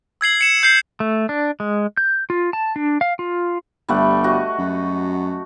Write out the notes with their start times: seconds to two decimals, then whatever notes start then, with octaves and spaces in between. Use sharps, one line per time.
0.21 E6 G#6 C7 F#7
0.41 C#7 E7
0.63 G6 C7 F#7
1.00 A3
1.29 D4
1.60 G#3
1.97 G6
2.30 F4
2.53 A5
2.76 D4
3.01 F5
3.19 F4
3.89 G1 G3 A3 F#5
4.24 F#4 D#5
4.58 F#2